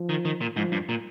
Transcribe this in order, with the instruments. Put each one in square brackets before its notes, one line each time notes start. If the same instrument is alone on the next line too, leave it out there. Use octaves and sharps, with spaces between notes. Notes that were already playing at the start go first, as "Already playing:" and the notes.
Already playing: [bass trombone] F3
[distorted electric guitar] D#3
D#3
A#2
[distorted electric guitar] G#2 [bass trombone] F3
[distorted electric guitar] G2
A#2